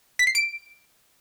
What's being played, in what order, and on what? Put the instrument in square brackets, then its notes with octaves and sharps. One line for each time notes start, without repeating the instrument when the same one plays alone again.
[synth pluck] B6
C7
D7